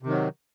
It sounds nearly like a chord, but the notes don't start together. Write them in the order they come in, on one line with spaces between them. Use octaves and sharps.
C3 D#3 F#3